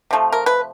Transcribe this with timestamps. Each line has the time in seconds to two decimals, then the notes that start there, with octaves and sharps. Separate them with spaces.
0.11 C3 F3 A3
0.33 A#4
0.46 B4